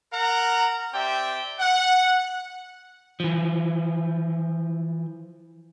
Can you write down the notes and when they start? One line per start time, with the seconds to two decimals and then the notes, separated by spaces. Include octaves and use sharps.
0.13 A#4 F#5 A#5
0.93 C4 G4 D5 E5 G5
1.59 F#5
3.20 E3 F3